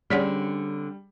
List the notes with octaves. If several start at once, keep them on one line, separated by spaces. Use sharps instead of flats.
D3 G3 C4 C#4 G#4 D5 F#5